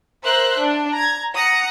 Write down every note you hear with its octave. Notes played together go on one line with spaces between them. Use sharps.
A#4 C5 E5 F#6
D4
A#5 G#6
F#5 A#5 D#6 A#6 C#7